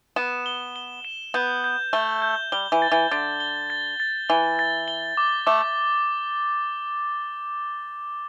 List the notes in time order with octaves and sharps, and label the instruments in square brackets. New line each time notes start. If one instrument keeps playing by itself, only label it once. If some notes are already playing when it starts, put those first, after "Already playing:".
[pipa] B3 [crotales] E7
[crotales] G7
G7
E7
[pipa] B3 [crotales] G6
[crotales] G6
[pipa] A3 [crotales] G7
[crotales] G6
[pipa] G3 [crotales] G7
[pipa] E3
[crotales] A6
[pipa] E3
[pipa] D3 [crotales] A6
[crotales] G7
A6
A6
[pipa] E3 [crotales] G7
[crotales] A6
G7
D6
[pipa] A3 [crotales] D6